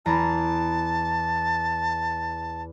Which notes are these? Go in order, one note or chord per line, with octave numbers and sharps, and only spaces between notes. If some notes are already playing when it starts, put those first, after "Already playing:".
E2 A5 A#5